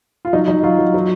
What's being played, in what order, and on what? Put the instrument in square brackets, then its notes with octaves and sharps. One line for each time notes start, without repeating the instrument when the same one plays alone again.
[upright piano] F4
F#3 D#4
F#3 D#4
F#3 F4
F#3
F#3